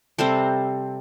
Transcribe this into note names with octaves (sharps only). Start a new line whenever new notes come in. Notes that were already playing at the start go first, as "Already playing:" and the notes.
C3 G3 C4 A4 C5